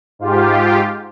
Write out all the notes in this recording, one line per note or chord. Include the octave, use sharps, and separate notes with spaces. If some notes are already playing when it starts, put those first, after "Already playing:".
G#2 F4 G4